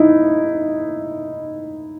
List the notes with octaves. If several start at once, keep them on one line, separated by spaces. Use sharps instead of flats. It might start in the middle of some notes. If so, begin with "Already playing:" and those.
Already playing: D#4 E4